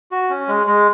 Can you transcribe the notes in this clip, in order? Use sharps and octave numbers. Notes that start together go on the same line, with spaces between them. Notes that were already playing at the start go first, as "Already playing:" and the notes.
F#4
C#4
G#3
G#3